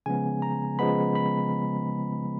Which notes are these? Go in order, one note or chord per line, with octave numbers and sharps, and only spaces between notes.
C#3 F3 G#3 B3 G#5
A#5
C#3 F3 G#3 B3 B5
B5